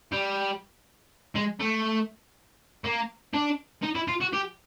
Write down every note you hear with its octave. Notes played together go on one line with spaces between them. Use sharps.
G3
G#3
A3
A#3
D4
D#4
E4
F4
F#4
G4